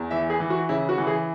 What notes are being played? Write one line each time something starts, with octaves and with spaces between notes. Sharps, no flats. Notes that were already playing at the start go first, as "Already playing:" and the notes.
Already playing: E2
E3 E5
G#4
E3
F#4
C#3 E4
F#4
E3
G#4